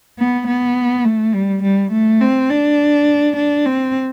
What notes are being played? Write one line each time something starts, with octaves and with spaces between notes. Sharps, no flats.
B3
B3
A3
G3
G3
A3
C4
D4
D4
C4